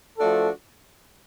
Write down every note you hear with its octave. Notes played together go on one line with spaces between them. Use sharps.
F3 A3 D4 F#4 A4